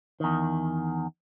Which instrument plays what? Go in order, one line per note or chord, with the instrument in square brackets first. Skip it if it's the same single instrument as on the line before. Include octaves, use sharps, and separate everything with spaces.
[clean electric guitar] E2 D#3